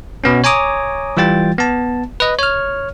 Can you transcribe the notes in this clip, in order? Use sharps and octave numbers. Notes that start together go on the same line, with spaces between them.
B2 B3 C#4
C#5 G#5 A#5 D6 D#6
E3 G3 F4 G5 A6
B3 A5
B4 D#5
C#5 F6